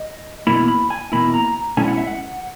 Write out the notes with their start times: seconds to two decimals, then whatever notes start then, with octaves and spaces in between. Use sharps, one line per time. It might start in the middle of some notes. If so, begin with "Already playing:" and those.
Already playing: D#5
0.47 E2 B2 A#3 E4 B5
0.68 B5
0.90 G#5
1.12 E2 B2 A#3 E4 B5
1.34 A#5
1.77 B2 G#3 C#4 E4 G#5
1.88 F#5
1.97 E5
2.07 F#5